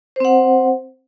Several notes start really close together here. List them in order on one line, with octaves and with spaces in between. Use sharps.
C5 C4 F#5